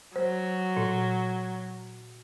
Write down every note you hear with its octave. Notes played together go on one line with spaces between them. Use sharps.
F#3 C5
A#2